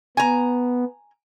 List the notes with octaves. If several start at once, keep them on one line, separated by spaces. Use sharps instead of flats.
B3 G#5 A#5